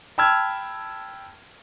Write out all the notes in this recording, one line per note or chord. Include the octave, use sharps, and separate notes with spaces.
G5 A5 B5 E6 F6 G#6